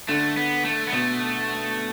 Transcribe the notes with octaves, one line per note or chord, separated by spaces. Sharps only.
D3 A3
B3
A3
B3
B2 A3